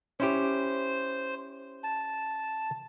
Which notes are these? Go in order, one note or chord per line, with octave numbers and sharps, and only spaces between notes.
C#4 E4 G4 C5
A5